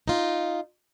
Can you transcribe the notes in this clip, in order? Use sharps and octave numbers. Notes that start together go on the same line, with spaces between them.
D#4 F4